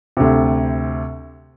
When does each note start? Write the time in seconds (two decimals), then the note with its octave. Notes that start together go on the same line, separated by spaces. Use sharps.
0.17 D2 C3